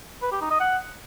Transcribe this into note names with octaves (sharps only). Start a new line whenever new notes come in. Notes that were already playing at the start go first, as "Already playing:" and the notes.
B4
G4
D#4
D#5
F#5